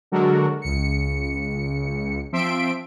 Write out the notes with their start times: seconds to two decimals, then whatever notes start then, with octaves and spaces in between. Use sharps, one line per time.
0.12 D3 F#3 G#3 F#4 A4 A#4
0.62 C#2 C#7
2.32 F3 C4 E5 C6 B6 D7